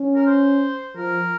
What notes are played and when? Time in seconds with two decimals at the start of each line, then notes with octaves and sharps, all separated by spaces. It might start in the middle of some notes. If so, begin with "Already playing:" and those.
Already playing: C#4
0.15 A#4
0.27 C5
0.96 F3 A#4